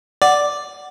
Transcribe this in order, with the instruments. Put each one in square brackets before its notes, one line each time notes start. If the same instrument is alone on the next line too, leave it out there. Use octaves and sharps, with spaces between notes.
[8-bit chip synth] D5 [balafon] F#5